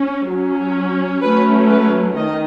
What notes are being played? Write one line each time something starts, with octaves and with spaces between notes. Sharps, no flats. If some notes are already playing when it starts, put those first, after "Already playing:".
Already playing: C#4
F#3 C#4
F#3 A3 C#4 B4
B4
D#3 D#5